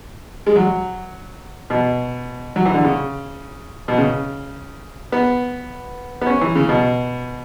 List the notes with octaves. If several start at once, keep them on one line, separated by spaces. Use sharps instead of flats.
G#3
F#3
B2
F#3
E3
D3
C#3
B2
C#3
B3
B3
C#4
E3
C#3
B2